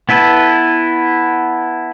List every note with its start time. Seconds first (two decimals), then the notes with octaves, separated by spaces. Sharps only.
0.09 B3 E4 A4 B4